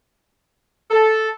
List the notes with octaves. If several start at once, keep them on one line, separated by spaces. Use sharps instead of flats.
A4